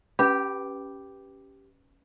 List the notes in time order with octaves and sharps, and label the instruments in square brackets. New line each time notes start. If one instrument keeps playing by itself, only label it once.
[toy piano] C#4 B4 B5 [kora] G4